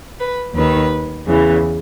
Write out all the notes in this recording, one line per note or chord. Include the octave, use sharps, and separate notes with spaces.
B4
D#2 D#3 B4
E2 C#3 E3